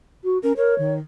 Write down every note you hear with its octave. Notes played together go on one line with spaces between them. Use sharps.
F#4
C#4 A#4
A#4 C#5
D#3